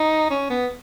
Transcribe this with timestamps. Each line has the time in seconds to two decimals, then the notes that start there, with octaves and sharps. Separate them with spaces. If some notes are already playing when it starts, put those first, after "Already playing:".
Already playing: D#4
0.31 C#4
0.50 B3